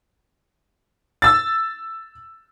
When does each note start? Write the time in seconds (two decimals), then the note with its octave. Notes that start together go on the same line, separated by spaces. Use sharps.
1.22 E6 A6